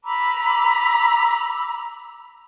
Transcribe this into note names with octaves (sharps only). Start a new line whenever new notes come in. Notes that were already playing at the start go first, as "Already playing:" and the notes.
A#5 B5 D6 E6